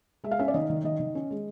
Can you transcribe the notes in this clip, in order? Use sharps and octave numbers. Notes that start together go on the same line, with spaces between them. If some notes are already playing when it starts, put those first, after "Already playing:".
G#3 E5
F5
C#4 E5
D5
D#3 D#5
D#3
D#3 D#5
D#3
C#4
G#3